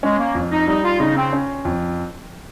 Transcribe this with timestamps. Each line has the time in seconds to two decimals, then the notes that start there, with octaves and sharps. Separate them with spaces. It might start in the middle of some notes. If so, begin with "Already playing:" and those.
0.03 G#3 C#4
0.18 A#3
0.35 F2
0.51 D#4
0.68 G3 D#4
0.84 F4
1.00 C#3 D#4
1.16 C4
1.33 C#4
1.65 F2